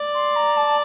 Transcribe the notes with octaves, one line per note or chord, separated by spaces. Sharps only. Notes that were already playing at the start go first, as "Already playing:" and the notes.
Already playing: D5
C6
A#5
A5